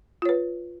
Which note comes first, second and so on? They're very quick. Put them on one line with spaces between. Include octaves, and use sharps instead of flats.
F4 C#5 B4